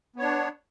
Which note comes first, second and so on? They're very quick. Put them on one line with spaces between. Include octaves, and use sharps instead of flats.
B3 C#5 D4